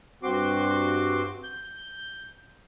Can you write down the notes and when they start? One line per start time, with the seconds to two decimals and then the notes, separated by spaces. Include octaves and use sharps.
0.23 G2 C4 F#4 C6 D6
1.44 G6